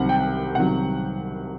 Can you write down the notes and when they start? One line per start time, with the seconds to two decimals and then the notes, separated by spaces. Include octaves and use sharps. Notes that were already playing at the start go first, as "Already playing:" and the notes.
Already playing: C2 C3 D#3 F#3 F#5
0.09 G5
0.55 C2 C3 D#3 F#3 F#5